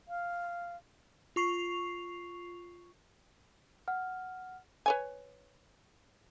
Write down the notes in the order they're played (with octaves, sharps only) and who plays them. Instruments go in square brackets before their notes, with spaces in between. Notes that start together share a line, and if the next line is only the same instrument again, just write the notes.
[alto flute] F5
[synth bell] F4 C#6 C7 F7
[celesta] F#5 F6
[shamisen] B4 C#5 G#5